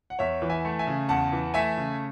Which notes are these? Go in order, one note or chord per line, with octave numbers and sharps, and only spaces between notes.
F#5
E2 C#5 E5
E3
E5 G#5
A3
E5 G#5
C#3
E2 F#5 A5
E3
A3 E5 G#5
C#3